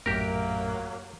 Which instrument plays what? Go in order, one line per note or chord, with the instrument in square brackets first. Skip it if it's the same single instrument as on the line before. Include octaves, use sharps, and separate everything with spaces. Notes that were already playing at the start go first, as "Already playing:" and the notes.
[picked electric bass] A#1 F#2 A2 [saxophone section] F#3 A#3 [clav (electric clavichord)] G4 A#4